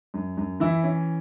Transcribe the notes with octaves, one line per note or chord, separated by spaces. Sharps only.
F#2
F#2
E3 E4
C#4